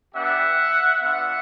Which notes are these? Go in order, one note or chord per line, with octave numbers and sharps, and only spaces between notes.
B3 D4 G4 E5 F#5
B3 D4 F4 E5 F#5